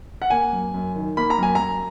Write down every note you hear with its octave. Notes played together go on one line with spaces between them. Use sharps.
F#5
A#3 G#5
F#2
F#2
D#3
A#3 B5
A#5
F#2 G#5
F#2 A#5